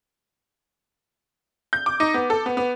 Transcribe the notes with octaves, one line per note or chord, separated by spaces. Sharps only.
G6
D6
D#4
B3
A4
B3
B3